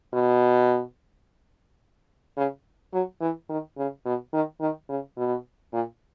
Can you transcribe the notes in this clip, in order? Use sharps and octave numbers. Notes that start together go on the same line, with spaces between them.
B2
C#3
F#3
E3
D#3
C#3
B2
D#3
D#3
C#3
B2
A#2